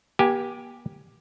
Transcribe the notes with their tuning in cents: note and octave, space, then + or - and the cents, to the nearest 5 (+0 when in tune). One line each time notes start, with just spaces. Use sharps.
A#3 +45 G4 +0 G#5 +0